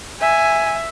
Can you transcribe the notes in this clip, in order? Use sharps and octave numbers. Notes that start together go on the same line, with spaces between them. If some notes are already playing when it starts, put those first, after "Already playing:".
E5 G#5